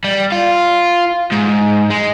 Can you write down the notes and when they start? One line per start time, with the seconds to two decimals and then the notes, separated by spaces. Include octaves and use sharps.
0.04 G3
0.32 F4
1.32 G#2
1.91 G#3